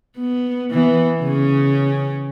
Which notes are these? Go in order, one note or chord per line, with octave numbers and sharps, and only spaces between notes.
B3
E3 B3
C#3 C#4